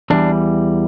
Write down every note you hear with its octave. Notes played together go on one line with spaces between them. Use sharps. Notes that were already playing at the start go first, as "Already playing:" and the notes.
E2 E3 G3 A3 D4